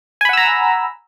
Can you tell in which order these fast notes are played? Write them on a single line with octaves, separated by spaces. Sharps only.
G#5 B5 F#5 E6 A#5